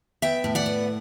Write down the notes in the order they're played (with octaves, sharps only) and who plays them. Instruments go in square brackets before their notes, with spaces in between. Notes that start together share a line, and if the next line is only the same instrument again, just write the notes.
[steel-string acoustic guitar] B3 E5 G5
A2
D5 F#5
B3